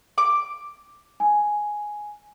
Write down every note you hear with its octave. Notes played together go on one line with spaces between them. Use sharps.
D6
G#5